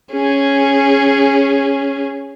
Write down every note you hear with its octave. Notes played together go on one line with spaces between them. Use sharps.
C#4 G#4